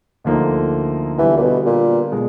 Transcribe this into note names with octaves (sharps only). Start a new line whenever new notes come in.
D2 D3 F3 A#3 D#4
D3 E3 G3 B3
A#2
B2
A#2
B2 G#3